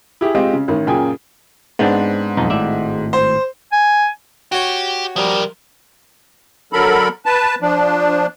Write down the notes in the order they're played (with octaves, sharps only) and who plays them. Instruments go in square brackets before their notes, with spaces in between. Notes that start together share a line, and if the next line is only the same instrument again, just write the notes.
[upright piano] E4 G4 G#4 E5
G#3 C4 F4 G4 D#5
C#3
A1 D#3
F#2 A#2 C#3 G#4 G5 G#5
[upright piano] G#2 [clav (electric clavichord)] B3 C4 D4
[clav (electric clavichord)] B1 F2 D#4
[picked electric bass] G#1 A2 [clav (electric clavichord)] D5 E5
[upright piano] C5
[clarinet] G#5
[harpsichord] F#4 C#5 [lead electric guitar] G4 G5
[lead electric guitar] F3 A#4 [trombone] G3
[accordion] D3 F#3 A4 A#4 B5
B4 A5
F3 D4